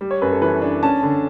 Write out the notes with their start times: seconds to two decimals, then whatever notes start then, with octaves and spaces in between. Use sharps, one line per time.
0.01 G3
0.11 C#5
0.22 F#2 B4
0.32 A4
0.42 E3 B4
0.62 D4
0.83 C#4 A5
1.03 D3